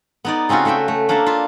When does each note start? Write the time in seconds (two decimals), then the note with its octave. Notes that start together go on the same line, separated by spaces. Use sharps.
0.25 B3 D#4 D5
0.49 C#3 C4 C#4 F4 F#4
0.65 A3 F#4 B4 E5 G5
0.88 A3
1.09 A#3 D4 A4 E5 F5 A#5
1.26 F4 E5